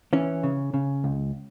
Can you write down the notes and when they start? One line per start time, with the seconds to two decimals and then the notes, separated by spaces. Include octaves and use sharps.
0.13 E3 C#4
0.43 C#3
0.74 C#3
1.04 C#2